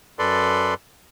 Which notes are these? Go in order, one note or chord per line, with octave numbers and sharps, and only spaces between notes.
F#2 A4 B4 D5 C6